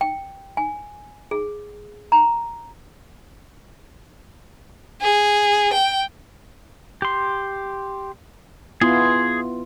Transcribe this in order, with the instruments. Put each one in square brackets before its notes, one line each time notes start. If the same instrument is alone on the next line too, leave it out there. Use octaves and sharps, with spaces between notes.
[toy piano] G5
G#5
G#4
A#5
[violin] G#4
G5
[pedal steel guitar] G4 C6
[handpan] B3 E4 F4 [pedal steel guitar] G#4 C6